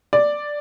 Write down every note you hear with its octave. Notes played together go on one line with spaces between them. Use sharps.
D5